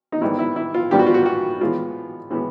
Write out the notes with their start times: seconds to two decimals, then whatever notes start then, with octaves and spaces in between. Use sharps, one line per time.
0.12 D#4
0.21 G#2 D#3 G3 B3 E4
0.39 E4
0.56 E4
0.74 F4
0.91 G#2 D#3 G3 B3 G4
0.99 F#4
1.07 F4
1.14 F#4
1.25 F#4
1.60 A2 E3 G#3 B3 F4
2.30 A2 E3 G#3 B3